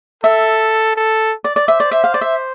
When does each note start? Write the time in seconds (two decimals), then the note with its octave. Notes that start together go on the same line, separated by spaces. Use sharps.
0.24 A4 E5
0.96 A4
1.44 D5
1.56 D5
1.68 C5 E5
1.80 D5
1.91 E5
2.04 F5
2.14 D5
2.21 E5